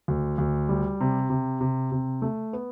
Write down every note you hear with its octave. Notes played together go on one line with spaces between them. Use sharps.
D2
D2
G3
C3
C3
C3
C3
A3
B3